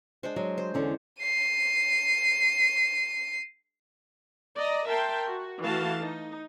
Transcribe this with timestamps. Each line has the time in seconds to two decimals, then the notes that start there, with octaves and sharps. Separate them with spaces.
0.23 G#3 D4 C5
0.36 F#3 G#3
0.58 C5
0.74 E2 D3 C#4
1.22 C7 D#7
4.56 D5 D#5 A#5
4.88 A#4 E5 G5 A5 C6
5.26 F#4
5.61 E3 A3 F#4 F5 A5
5.99 D#4